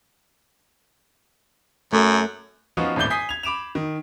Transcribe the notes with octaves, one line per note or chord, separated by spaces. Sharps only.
F#2 A3 A4
F3 B3 C#4 D#4 F4 F#4
D#1 G#1 A2 D5 G6 G7
G#5 D#6 G6 B6 C7
G#6 F7
B5 D6 D7 E7 F7
D#3